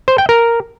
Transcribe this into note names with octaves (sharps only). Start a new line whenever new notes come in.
C5
G5
A#4